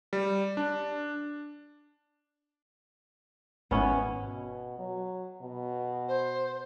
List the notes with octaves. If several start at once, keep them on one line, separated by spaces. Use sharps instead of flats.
G3
D4
G#1 B3 C#4 E4
B2
F#3
B2
C5